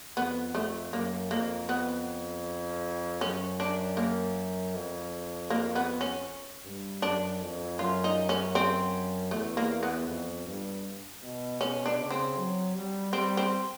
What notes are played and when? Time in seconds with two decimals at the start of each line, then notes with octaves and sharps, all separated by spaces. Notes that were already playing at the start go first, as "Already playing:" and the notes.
0.16 F2 B3
0.54 F2 A3
0.93 F#2 A#3
1.31 F2 A#3
1.69 B3
3.21 F#2 C#4
3.60 D4
3.97 A#3
4.74 F2
5.50 A#3
5.75 B3
6.01 C#4
6.65 G2
7.02 F#2 D4
7.41 F2
7.78 F#2 F4
8.04 D#4
8.29 C#4
8.55 C4
9.31 E2 A3
9.57 A#3
9.83 B3
10.07 F2
10.46 G2
11.22 B2
11.61 B2 C#4
11.86 D4
11.98 C#3
12.11 C4
12.36 F#3
12.75 G3
13.13 G3 C4
13.37 C4